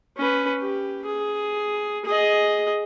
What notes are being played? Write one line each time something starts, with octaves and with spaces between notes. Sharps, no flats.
C#4 B4
G4
G#4
G#4 D#5